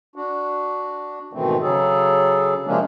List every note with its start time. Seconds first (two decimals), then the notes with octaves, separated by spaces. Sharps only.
0.16 D4 F#4
1.33 G#2 B2 D#3 E3 A3 C4
1.62 C#3 F#3 G#4 A4
2.66 C3 F3 G#3 A#3 C#4 D4